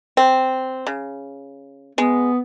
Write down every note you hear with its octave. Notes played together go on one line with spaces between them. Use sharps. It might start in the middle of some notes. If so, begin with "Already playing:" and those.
C4
C#3
G#3 B3